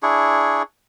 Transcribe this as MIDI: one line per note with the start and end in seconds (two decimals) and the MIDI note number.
0.03 0.62 62
0.03 0.62 64
0.03 0.62 68
0.03 0.62 85